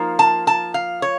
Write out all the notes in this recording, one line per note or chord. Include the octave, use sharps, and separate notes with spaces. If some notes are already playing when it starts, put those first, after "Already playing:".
Already playing: F3 A#3 D#4
A5
A5
F5
C#5